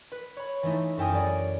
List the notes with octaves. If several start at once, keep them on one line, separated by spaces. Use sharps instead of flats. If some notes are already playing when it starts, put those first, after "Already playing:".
B4
C#5 B5
E3 G#3 A3 D#4 E4
F#2 E4 A4 G5 G#5 D#6
F#3 G#4 D5
D7